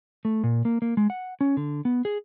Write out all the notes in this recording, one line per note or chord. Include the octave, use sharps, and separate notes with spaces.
A3
A#2
A#3
A#3
G#3
F#5
C#4
D3
B3
G#4